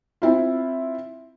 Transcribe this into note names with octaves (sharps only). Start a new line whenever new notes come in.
C4 E4 F4